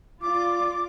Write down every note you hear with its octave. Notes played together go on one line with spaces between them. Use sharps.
F4 D5 D6